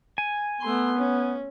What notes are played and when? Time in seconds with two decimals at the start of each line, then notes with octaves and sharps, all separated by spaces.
0.18 G#5
0.61 A3 B3 C6
0.98 C#4